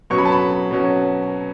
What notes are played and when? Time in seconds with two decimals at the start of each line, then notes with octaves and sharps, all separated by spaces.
0.10 B2 F#3 C#4 C#6
0.18 B5
0.25 A5
0.32 B5
0.71 B2 F#3 C#4